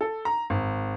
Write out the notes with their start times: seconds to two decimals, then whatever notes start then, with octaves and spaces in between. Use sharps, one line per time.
0.01 A4
0.25 A#5
0.50 G#1